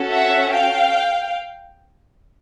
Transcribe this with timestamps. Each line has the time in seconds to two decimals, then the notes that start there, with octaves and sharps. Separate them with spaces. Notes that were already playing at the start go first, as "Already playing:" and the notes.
Already playing: C#4 F#4 A4
0.10 E5 F#5
0.52 F5 G5